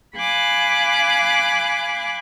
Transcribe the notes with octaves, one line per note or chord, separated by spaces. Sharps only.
F5 G#5 B5 D6 F#6